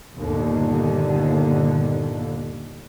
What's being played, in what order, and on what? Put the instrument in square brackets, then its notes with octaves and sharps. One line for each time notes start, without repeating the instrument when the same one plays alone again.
[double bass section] G1 D#2 A#2 D3